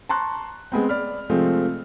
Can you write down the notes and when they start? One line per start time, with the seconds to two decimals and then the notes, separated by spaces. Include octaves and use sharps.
0.09 A5 A#5 C6 C#6 F#6
0.72 G#3 B3 C4
0.89 D5 B5 F6
1.29 C3 F3 G#3 A3 C4